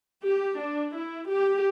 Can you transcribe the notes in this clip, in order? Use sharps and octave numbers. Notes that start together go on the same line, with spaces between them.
G4
D4
E4
G4